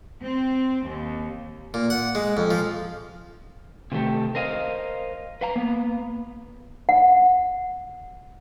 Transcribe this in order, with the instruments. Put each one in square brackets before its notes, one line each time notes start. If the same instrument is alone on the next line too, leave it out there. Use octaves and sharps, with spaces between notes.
[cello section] C4
D#2
[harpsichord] A#2
F#5
G#3
F2
F3
[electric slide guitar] C3 D#3 A3 E4 G4 A4
A#4 C5 D#5 F5
B4 F5 A#5
A#3 B3
[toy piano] F#5